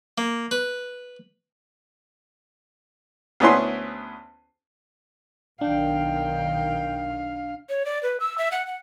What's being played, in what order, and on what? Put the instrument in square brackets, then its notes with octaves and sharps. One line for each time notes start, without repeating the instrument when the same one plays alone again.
[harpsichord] A#3
B4
[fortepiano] D2 B3 C#4 E4 G#4 C6
[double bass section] B1 D#3 [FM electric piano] D4 [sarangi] F5 [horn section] G5
[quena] C#5
D5
B4
E6
E5
F#5
F#5